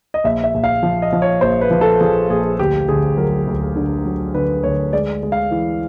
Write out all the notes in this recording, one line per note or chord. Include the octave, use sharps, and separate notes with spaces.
D#5
A#1 E5
E5
A#1
F5
F3
D#5
F3
C#5
A#1 C5
B4
F3
A4
F3 G#4
A#1 G#4
D2 G4
D2 G#4
F#3 A#4
D2
D3
F#3
D3 B4
D2 C#5
G#3 D5
G#3
F5
E3